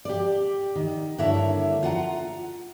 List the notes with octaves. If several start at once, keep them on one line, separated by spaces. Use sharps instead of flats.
G4 D5
D#3
G2 D3 A#3 E4 C#5 E5
F4 F#5 G#5 A#5